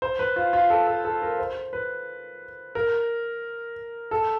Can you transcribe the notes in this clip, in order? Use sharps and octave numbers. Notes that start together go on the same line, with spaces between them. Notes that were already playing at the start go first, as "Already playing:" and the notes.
C5
B4
F4
F4
A4
A4
A4
A#4
C5
B4
A#4
A4